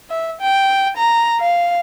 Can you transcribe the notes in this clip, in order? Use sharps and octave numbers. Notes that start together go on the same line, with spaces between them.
E5
G5
A#5
F5